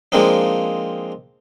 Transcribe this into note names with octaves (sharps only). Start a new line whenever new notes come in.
F3 G#3 A#3 C4 D4 D#4